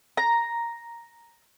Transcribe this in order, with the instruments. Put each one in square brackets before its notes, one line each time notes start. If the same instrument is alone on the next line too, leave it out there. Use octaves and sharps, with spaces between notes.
[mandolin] A#5